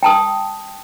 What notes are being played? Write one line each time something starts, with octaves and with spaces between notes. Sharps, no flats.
G5 A5 D#6